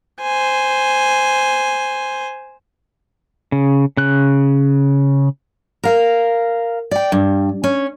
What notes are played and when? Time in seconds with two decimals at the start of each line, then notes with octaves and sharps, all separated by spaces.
0.21 C5 G#5
3.52 C#3
3.97 C#3 F#6
5.84 A#4 F5
6.91 D5 G5
7.12 G2
7.64 C#4